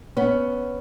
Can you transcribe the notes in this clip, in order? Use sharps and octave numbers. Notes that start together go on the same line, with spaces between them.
B3 C#4